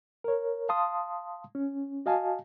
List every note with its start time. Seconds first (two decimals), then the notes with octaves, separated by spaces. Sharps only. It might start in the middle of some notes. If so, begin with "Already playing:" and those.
0.24 A#4 C#5
0.69 F5 A5 C6 D#6
1.55 C#4
2.06 F#4 D#5 F5 G#5 A5